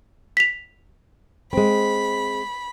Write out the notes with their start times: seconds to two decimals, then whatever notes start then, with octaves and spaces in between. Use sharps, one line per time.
0.37 B6 F7
1.53 G#3 C4 B5